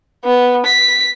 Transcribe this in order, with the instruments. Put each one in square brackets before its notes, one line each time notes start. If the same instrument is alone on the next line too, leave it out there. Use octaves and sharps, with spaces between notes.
[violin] B3
B6